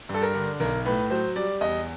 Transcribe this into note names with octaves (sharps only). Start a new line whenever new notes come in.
G2
A4
A#4
D3
B1 A#4
A2 B4
F#3 C5
G3 D5
E2 D#5